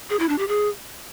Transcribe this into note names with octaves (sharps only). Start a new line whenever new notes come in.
G#4
E4
D4
G4
G#4